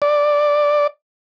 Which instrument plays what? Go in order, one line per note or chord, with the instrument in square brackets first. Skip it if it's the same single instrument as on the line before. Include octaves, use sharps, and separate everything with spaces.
[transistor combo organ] D5